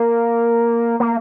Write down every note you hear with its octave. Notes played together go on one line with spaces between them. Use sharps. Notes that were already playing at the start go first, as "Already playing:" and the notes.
Already playing: A#3
A#3